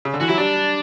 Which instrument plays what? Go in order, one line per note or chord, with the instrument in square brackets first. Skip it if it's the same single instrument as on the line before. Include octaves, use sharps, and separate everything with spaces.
[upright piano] C#3
D3
[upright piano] E3 [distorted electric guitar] F#4
[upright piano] F#3 [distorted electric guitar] E4
[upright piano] G3 [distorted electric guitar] D4
[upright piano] G3